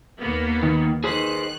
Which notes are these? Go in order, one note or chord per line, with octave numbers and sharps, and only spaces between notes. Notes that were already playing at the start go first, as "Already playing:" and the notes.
D#2 A#3 B3
D#3
D#3 G#4 B4 C5 F#6